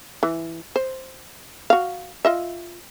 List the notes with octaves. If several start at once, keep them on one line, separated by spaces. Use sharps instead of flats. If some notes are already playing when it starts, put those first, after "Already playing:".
E3
C5
F#4 F5
F4 D#5 E5